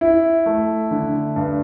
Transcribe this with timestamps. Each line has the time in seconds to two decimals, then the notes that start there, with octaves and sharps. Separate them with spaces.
0.01 E4
0.46 A3
0.91 D3
1.36 G2